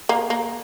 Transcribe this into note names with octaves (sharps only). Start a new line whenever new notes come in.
A#3
A#3